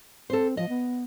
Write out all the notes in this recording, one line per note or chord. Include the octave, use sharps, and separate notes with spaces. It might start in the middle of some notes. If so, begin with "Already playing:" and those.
C4 A4 C5
F3 D#5
B3